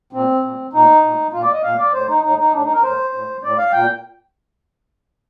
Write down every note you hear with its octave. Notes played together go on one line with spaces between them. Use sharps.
A#2 C4
A#2
A#2 D#4
A#2
A#2 F4
D5
D#5
A#2 F5
D5
A2 C5
D#4
A2 D#4
D#4
A2 D4
D#4
A#4
A2 C5
A2
A2 D5
F5
A#2 G5